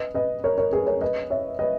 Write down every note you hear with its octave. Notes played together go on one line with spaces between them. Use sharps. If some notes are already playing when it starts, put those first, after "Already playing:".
Already playing: B4 D#5
B4 D#5
A#4 C#5
A#4 C#5
G#4 B4
A#4 C#5
B4 D#5
C#5 E5
B4 D#5